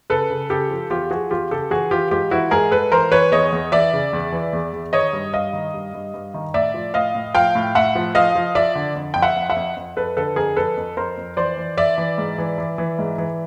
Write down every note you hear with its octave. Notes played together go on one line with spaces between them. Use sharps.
C#3 A4 B4
C#3
C#3 G4 A4
F3
E2 F4 G4
F3 F#4 G#4
E2 F4 G4
C#3 G4 A4
E3 F#4 G#4
E3 F4 G4
G#2 F4 G4
E3 E4 F#4
G#2 G#4 A#4
G#2 A4 B4
E3 A#4 C5
E3 B4 C#5
E2 C#5 D#5
E2
E3 D5 E5
C#3
E2
E3
E2
E2
D#3 C#5 D#5
G2
G2 D#5 F5
D#3
G2
G2
G2
D#3
A2 D5 E5
F3
A2 D#5 F5
A2
F3 F5 G5
A2
A2 E5 F#5
F3
F3 D#5 F5
F3
F3 D5 E5
D3
F2
F2 G5
E5 F#5
F2
E5 F#5
F2
F2
F2 A4 B4
D3 A4 B4
F2 G#4 A#4
F2 A4 B4
F2
F2 A#4 C5
F2
E3 C5 D5
E3
E3 D5 E5
E3
G#2
E3
E3
E3
G#2
E3